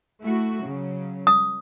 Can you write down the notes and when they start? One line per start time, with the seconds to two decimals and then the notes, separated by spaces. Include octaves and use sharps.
0.23 A3 E4 F#4
0.64 C#3 F#3
1.27 D#6